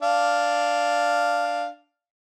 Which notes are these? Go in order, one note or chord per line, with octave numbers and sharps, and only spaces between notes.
D4 F5